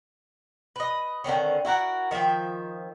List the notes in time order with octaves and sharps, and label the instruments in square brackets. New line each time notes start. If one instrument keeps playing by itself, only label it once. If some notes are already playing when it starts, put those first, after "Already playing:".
[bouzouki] B4 D#5
D3 D#3 C4 C#4
E4 F#4 A#4 F#5
D#3 F3 E5 G5